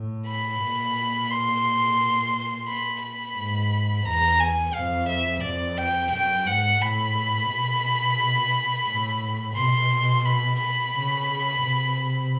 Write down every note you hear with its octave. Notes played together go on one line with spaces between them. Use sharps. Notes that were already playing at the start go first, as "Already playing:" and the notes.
Already playing: A2
B5
A#2
C6
B5
B5
G#2
E2 A#5
G#5
F2 F5
E5
F2 D5
G5
F#2 G5
G#2 F#5
A2 B5
B2
A2
B2 C6
B5
B5
C#3
C3